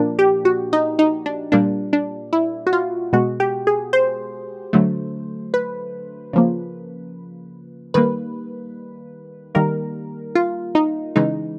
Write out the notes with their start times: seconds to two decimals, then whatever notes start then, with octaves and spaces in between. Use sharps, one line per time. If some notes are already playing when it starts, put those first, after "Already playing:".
Already playing: A#2 F3 A#3 D4
0.19 G4
0.45 F#4
0.73 D#4
0.99 D#4
1.26 D4
1.52 A#2 G3 A#3 D4
1.93 D4
2.33 E4
2.67 F#4
2.73 F4
3.13 B2 G#3 F#4
3.40 G4
3.67 G#4
3.93 C5
4.73 D3 F#3 A3
5.54 B4
6.33 C#3 F3 A#3
7.94 D#3 G3 A#3 B4
9.55 D#3 G3 A#3 A#4
10.35 F4
10.75 D#4
11.16 C#3 E3 G#3 D#4